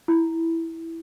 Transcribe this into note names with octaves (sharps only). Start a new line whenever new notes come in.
E4